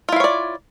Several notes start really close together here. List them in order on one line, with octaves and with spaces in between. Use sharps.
F4 E4 F5 C#5 D5